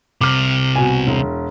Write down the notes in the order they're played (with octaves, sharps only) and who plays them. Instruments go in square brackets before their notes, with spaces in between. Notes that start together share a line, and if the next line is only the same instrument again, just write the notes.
[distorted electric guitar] C2 C3 [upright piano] D6 F6
[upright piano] B2 G#5
E1